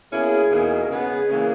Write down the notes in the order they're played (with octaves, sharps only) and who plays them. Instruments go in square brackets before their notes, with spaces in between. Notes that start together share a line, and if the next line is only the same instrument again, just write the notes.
[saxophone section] B2 A#3 C#4 E4 [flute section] G#4
[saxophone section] E2 B2 A#3 D#4
[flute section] A#4
[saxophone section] C#3 G#3 B3 [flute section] G#4
[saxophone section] C#3 E3 A#3